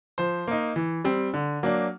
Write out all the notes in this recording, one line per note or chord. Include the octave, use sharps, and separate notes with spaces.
F3 C5
A#3 D#4
E3
G3 C4
D3
F#3 A#3 D4